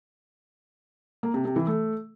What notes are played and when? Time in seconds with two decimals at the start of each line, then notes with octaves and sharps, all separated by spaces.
1.23 A#3
1.34 C3
1.45 C3
1.56 E3
1.67 A3